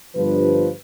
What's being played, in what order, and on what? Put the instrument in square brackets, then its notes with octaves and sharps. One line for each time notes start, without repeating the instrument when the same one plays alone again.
[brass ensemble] G1 G2 F3 B4